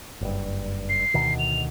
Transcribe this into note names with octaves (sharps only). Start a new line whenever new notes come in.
F#1 G2
C7
D2 B2 D#3
F7